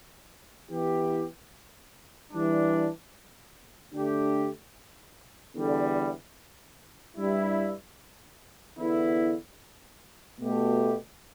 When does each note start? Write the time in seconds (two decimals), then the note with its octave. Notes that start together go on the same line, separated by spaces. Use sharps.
0.70 E3 B3 E4 G4
2.31 E3 G3 D4
3.93 D3 A3 D4 G4
5.55 E2 D3 G3
7.16 G2 G3 E4
8.77 E2 D3 B3 E4
10.39 B2 A3 G4